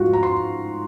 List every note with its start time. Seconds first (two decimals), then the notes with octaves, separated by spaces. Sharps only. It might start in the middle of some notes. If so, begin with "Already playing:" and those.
Already playing: G#2 F3 F4 F#4
0.13 A#5
0.23 C6